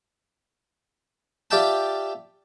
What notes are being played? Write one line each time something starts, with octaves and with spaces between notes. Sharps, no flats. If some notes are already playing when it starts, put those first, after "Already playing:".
F4 G4 D5 E5 G5 A5